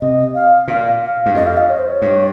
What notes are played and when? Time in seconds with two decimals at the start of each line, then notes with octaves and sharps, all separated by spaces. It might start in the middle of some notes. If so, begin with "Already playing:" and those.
0.01 C3 D#5
0.35 F5
0.68 A#2 F5
1.02 F5
1.26 G2
1.34 F2 D#5
1.47 F5
1.57 D#5
1.69 C#5
1.78 C5
1.88 C#5
2.02 G2